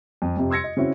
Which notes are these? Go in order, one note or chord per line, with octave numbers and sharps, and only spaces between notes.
F2
F2 C3
C6 E6 G#6 A#6 C#7
D#5
C#3 C4 C#4 E4 F#4